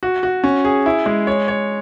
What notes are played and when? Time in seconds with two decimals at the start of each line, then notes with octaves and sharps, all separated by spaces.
0.03 F#4
0.23 F#4
0.44 C#4
0.65 G#4
0.86 E4
1.06 G#3
1.27 C#5
1.48 C#5